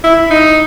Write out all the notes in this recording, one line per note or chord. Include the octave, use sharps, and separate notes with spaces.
E4
D#4